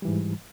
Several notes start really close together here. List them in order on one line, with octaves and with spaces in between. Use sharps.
G3 E3 G#2